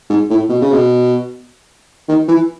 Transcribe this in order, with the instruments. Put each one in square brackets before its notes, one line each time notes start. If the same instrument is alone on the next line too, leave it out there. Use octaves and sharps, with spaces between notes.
[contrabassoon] G#2
A2
B2
C#3
B2
D#3
E3